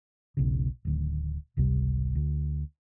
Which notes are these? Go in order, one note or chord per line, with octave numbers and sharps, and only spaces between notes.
E1 B1 C#3
D1 D2 D#3
G#1 C#2 C3 G3
D2